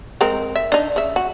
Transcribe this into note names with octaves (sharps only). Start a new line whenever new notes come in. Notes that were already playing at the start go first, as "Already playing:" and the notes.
G#3 C4 A#4
E5
D4 D#4
C#3 E5
F#4